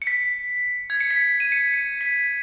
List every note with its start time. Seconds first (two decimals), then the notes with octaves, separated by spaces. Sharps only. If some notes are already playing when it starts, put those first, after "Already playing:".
0.02 C#7
0.07 B6
0.90 G#6
1.01 C#7
1.11 B6
1.40 D#7
1.52 C#7
1.74 C#7
2.01 B6